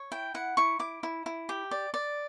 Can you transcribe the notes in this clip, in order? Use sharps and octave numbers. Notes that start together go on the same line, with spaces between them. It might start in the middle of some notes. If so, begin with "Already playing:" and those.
Already playing: C#5
E4 G5
E4 F#5
E4 C#6
E4 D6
E4
E4
G4
D5
D5